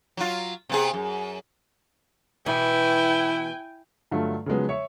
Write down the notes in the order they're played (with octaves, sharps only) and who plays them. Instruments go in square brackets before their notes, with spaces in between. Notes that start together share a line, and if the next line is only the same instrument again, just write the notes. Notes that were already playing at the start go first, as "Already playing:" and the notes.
[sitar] F#3 F4
C3 B3 G#4
F#2
[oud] B2 E3 [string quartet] E4 [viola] G5 G#5
[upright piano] G2 D3 F#3 A3 F4
C#3 F3 F#3 G#3 B3
C#5 E5 C#7